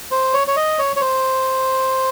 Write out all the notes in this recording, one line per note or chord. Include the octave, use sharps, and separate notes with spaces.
C5
C#5
C#5
D#5
C#5
C#5
C5